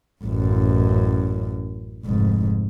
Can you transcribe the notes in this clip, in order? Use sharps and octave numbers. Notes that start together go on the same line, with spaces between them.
A1 F#2
F1 G#2